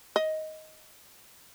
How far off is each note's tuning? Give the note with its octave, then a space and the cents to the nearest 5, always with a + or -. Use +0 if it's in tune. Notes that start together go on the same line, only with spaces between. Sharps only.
D#5 +10